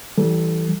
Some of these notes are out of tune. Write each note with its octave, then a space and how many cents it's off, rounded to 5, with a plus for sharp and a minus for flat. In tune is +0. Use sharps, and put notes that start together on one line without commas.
E3 +0 G3 -25 A4 +0